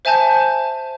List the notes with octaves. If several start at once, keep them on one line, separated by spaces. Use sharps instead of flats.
C5 E5 G#5 A5 G6